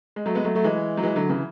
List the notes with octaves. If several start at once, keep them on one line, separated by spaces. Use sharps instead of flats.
G#3
F#3 A3
G#3 B3
F#3 A3
F#3 A3
E3 G#3
F#3
E3 G#3
D3 F#3
C#3 E3